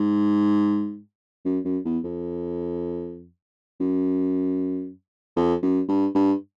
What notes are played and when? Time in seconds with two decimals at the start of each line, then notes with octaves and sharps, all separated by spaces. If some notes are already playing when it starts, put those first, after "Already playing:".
Already playing: G#2
1.45 F#2
1.65 F#2
1.85 E2
2.04 F2
3.80 F#2
5.36 F2
5.62 F#2
5.89 G2
6.15 G2